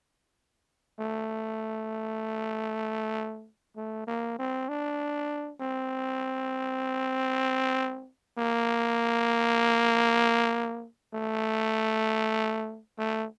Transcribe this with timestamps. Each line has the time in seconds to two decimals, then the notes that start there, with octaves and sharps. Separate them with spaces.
0.99 A3
3.77 A3
4.07 A#3
4.39 C4
4.69 D4
5.60 C4
8.38 A#3
11.14 A3
12.98 A3